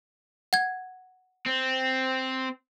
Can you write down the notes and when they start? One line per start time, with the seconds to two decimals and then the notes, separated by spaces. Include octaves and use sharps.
0.53 F#5 G#6
1.46 C4